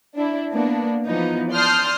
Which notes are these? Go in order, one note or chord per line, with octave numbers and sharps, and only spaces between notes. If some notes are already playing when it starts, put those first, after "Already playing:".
D4 E4
A#3 B3 D4
E3 F3 B3 D#4
D5 A5 C6 D#6 F6 G6